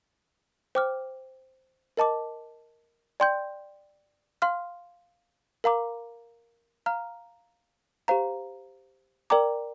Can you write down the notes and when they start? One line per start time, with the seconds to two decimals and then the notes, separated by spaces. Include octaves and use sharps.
0.75 C5 G5 D6 F6
1.97 A#4 D#5 A5 D6
3.20 D5 G5 C6 G6
4.42 F5 C6 F6
5.64 A#4 F5 A#5 D6
6.86 F5 A#5 F6
8.08 G4 C5 F5 A#5
9.30 A#4 D5 G5 A#5 D6